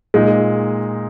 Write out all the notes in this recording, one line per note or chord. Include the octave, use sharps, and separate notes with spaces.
A#2 G#3 D#4